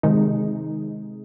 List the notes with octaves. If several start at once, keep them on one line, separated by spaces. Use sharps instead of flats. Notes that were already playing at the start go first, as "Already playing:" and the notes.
C3 D#3 G#3 D#4